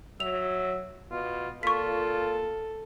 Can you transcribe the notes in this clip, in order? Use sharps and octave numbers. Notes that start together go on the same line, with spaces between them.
F#3 E5 F7
B2 F4
A#2 F4 A4 C#6 B6